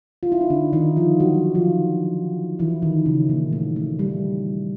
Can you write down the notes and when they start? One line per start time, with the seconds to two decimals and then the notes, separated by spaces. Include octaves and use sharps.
0.23 F4
0.32 E4
0.41 D#4
0.50 D3 D4
0.73 D#3 D#4
0.96 F3 F4
1.20 F#3 F#4
1.55 F3 F4
2.59 E3 E4
2.82 D#3 D#4
3.06 C#3 C#4
3.29 A#2 A#3
3.53 A3
3.76 A3
3.99 G3